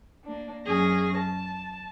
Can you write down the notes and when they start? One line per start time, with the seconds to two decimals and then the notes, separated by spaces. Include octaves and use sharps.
0.25 A#3 D4
0.67 F#2 C#4 G#4 A#6
1.16 A5